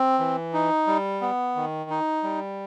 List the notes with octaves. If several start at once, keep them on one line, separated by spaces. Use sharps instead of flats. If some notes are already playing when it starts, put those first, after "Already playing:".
Already playing: C4
E3
D#4
G3
B3
D#3
D#4
G3